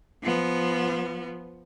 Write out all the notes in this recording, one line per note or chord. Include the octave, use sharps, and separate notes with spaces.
F3 B3